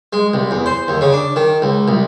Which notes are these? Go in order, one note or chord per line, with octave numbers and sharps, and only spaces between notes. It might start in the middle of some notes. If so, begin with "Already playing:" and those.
G#3
C2
E2
C5
D#2
C#3
D4
D#3
C#2
C2